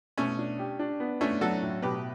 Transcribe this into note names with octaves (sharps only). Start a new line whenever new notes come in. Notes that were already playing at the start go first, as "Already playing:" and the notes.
B2 A3 C#4
D4
G4
D4
B3
A3 C#4 D4
F#3 F#4 A4
A2
B2 G4 B4